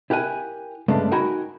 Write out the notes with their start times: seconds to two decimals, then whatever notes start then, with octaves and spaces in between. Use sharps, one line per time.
0.10 E4 G4 A#4 F#5 G#5
0.88 G2 C#3 G#3 A3 B3 D4
1.11 D#4 F#4 A#4 G5 G#5 B5